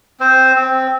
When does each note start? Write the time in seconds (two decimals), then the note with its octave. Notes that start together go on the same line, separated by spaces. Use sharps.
0.20 C4 C5
0.56 C4